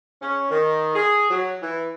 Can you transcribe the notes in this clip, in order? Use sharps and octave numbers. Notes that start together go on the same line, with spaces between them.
C#4
D#3
G#4
F#3
E3